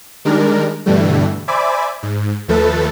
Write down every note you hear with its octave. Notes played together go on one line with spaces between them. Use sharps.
D#3 G3 G#3 D4 A#4
G2 B2 D3 E3 G3 A3
C5 D5 E5 G#5 B5 D6
G#2
D#2 F3 A3 A4 B4 A6